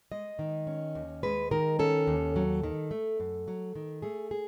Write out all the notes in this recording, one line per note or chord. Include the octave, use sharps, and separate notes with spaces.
G#3 D#5
D#3
C#4
D#2
G#3 B4
D#3 A#4
C#4 A4
D#2
F#3
D#3
A3
F#2
F#3
D#3
A3 G#4
G#4